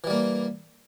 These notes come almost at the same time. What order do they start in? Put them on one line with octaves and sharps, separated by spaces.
E3 G3 A#3